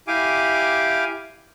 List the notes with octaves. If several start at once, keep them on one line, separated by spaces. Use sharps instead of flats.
E4 G4 F5 G#5 D6